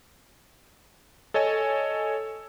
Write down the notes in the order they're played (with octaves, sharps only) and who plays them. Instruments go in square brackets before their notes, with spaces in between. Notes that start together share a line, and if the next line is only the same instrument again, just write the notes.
[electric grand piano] A4 C#5 D#5 G#5 E6